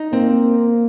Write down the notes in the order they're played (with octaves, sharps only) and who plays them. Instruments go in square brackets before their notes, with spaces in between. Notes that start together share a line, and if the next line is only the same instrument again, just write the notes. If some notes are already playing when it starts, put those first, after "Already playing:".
Already playing: [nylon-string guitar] D#4
[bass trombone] A#3 [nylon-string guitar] C4